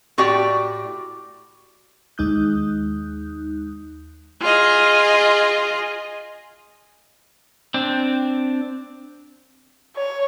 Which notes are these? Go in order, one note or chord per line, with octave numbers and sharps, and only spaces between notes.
A2 F#4 G4 D5 G5
D#2 G#3 D#4 D#6 F#6 G6
F4 G#4 D#5
C4 D4
C#5